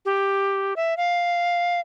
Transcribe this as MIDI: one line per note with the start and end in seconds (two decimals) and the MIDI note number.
0.05 0.74 67
0.76 0.97 76
0.97 1.80 77